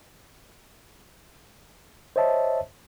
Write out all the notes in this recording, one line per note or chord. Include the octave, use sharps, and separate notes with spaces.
C5 C#5 D#5 E5 A5